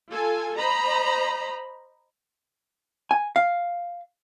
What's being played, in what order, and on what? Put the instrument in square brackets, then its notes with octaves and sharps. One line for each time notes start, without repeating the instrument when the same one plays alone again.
[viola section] F4 A4 G#5
C5 D#5 A#5 B5
[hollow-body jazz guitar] G#5
F5